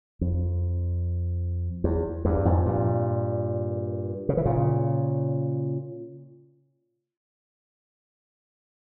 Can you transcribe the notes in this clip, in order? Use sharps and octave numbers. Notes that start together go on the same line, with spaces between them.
F2
E2
E2 G2
F2 G#2
G2 A#2
C#3
E3
A#2 C#3